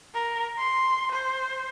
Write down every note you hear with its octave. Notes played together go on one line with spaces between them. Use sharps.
A#4
C6
C5